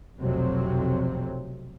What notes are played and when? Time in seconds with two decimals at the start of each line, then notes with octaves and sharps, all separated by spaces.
0.19 F1 B1 F2 C3 F#3 C4